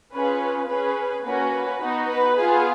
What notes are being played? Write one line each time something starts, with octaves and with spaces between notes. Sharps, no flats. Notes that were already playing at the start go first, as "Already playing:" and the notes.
C#4 F4 G#4 B4
C#4 G#4 B4
A#3 C#4 F#4 B4
B4
B3 D#4 F#4
B4
B3 F4 G#4